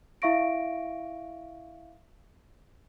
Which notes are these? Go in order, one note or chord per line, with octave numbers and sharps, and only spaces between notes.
E4 E5 F5 C#6 A#6 D7